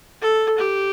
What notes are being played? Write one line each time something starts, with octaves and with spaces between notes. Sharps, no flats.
A4
G4